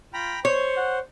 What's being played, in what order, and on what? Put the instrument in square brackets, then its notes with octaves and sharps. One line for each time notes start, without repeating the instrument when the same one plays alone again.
[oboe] F4 [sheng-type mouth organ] G5 A#5 B5
[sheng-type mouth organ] C5 [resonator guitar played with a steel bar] C#5 [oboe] C#6
[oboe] F#5